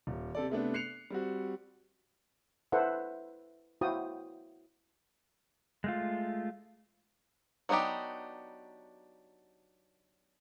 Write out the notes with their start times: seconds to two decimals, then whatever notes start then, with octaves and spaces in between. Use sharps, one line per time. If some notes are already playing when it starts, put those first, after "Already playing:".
0.07 D#1
0.35 C3 A4 D5
0.50 C3 A3 B3 D4
0.74 F#6 C7 C#7 F7
1.10 G3 C4 F#4
2.72 E4 A4 B4 C5 E5 F#5
3.81 E4 F#4 C5 F5 G5 D#6
5.84 G#3 A3 F4
7.69 F#3 B3 D4 D#4 G4